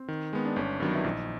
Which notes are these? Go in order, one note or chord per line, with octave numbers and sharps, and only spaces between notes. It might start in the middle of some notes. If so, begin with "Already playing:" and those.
Already playing: C4
D#3
G#3 B3
D4
G1 C#4
G2 D#3 F#3 B3 D4
E4
A#1 D#4